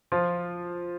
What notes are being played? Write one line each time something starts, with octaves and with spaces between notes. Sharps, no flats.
F3 F4